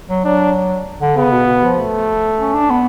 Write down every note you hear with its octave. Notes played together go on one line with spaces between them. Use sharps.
F#3
F#3 D4
D3
C#3 B3
B2
B2
F3
A3
C#4
D4
B3